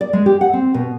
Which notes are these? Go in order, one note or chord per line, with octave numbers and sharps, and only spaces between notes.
D5
G#3
G4
F#5
C4
B2